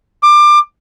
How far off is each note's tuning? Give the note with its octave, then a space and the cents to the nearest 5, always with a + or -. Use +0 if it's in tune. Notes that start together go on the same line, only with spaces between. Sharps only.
D6 +25